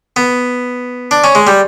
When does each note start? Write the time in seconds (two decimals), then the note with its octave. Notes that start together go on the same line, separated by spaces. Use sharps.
0.16 B3
1.11 D4
1.24 C#4
1.35 G#3
1.47 G3